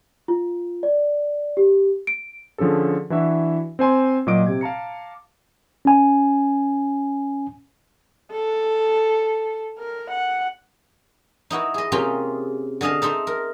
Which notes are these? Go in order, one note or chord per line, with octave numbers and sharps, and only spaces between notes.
F4
D5
G4
D7
D3 F3 C#4 G#4 A4
E3 D4 E4 F#4 E5
C4 C5 G#5 C6
A#2 F#3 D#5 D6 D7
C3 G#6
F5 A5 A#5 C#7
C#4 G#5
A4
A#4
F#5
D#4 E4 F#4 B4
G#4 D#5
C3 A#3 C#4 F4 G4 G#4
D3 G#4 D#5 F5 A5
D#4 A4 C5 E5
A#4